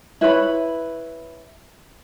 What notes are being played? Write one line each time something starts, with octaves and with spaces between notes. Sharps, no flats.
E4 B4 C#5 B5